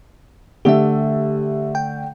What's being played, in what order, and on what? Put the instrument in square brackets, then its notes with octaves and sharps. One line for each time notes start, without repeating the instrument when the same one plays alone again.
[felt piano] D3 A3 [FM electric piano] G4 E5
[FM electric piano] G5